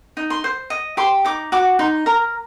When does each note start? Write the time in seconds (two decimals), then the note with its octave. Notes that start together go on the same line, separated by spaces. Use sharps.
0.17 D#4
0.30 C6
0.44 C5
0.70 D#5
0.97 G4 C6
1.25 D#4 D6
1.52 F#4 D6
1.79 D#4 C6
2.06 A#4 A#5